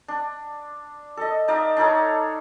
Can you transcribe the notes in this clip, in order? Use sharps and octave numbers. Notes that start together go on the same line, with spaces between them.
D4
A4 D#5
D#4 D5 E5 F5
D4 D#4 A4 C#5